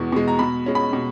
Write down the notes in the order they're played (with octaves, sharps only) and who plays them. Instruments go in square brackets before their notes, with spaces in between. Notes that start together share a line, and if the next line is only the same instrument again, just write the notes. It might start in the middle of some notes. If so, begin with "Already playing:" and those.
Already playing: [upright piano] E2 B2 G#3 C#6
B2 G#3
A#5
B2 B5
G#3 C#4
B5
B2